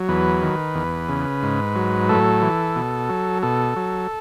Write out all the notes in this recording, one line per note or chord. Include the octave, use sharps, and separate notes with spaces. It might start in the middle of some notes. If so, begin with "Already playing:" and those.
Already playing: F#3
E2 B4
D#3
E2
C#3
G#2
F#3
A2 A4
E3
B2
F#3
B2 A4
F#3